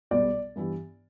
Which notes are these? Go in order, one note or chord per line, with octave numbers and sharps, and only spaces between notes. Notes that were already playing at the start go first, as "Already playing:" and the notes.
B1 B2 G3 B3 D5
G2 E3 B3 E4 G4